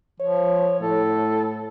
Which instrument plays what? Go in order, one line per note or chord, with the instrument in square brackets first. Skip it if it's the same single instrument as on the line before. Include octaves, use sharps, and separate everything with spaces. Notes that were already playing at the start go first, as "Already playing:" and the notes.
[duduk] F3 [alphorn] C#5
[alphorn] A2 [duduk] A4